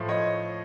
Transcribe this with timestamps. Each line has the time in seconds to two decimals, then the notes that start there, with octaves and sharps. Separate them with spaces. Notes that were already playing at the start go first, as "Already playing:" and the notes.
Already playing: A2 F3 A3
0.08 C#5 D#5